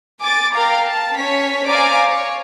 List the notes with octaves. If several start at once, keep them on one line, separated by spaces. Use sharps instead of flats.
G#5 D6 A6
A#4 F5 G5 A#5
A5
C#4 C#5 B6
C5 D5 F5 G#5 A#5 D6
C#5